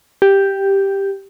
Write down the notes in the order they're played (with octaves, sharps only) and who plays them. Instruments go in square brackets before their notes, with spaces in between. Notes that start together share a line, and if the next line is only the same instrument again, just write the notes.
[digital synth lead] G4